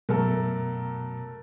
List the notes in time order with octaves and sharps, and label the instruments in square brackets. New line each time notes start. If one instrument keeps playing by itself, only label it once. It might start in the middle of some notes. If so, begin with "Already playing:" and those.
[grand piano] F#2 [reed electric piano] B2 [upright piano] A3 A4 A#4